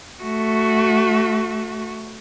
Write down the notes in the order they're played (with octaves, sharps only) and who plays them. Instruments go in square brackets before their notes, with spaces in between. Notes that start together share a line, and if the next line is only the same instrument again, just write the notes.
[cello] A3 F#4